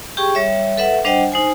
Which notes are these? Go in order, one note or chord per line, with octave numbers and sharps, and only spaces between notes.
G4 G#4 G5 C#6
G3 C#5 E5
A4 B4 E5 F#5
G3 D4 C5 D#5 F#5 G5
D#4 C5 G#5